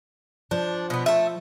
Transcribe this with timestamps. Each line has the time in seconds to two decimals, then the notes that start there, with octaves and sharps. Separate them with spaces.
0.51 F3 D4
0.90 B2 B3
1.06 A3 E5